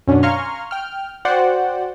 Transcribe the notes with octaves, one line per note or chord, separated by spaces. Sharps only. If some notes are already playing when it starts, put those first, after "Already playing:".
F#2 B2 C#4 D4
F5 G#5 A#5 C6 C#6 F6
G5 F6
F#4 C5 D5 F#5 G5